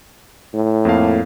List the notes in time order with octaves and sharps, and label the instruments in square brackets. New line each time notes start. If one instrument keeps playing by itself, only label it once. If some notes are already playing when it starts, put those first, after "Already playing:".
[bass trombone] A2
[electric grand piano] F2 A#3 F5